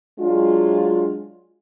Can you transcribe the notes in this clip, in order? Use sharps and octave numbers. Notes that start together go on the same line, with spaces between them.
F#3 G#3 D4 F4